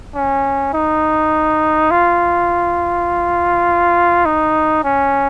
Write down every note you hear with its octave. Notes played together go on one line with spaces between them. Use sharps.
C#4
D#4
F4
D#4
C#4